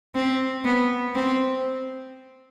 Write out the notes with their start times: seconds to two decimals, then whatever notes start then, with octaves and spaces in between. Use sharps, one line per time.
0.15 C4
0.65 B3
1.15 C4